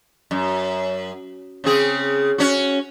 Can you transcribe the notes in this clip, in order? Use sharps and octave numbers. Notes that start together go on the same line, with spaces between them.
F#2
C#3 C4 G#4
C#4 F#4